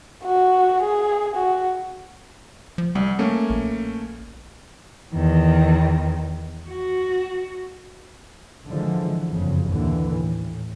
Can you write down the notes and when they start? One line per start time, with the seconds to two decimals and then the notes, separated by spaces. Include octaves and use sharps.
0.25 F#4
0.83 G#4
1.36 F#4
2.78 F3
2.95 C2 G3
3.19 A3 A#3 C#4
3.50 A#1
5.14 E2 D#3
6.68 F#4
8.68 D3 E3 F3 G#3
9.32 F#1 F2 C#3
9.70 A#1 D#2 D3 E3
10.15 A2